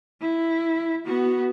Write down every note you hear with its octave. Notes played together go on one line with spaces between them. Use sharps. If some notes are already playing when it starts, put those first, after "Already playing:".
E4
B3 F#4